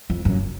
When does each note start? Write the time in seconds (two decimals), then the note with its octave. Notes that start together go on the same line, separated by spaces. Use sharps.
0.10 F2
0.25 F#2